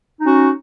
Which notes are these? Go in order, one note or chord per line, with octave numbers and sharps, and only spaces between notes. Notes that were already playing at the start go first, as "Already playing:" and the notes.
C#4 D#4 F#4